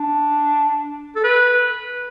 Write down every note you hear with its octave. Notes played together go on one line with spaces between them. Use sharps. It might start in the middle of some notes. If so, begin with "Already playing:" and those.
Already playing: D4
A4
B4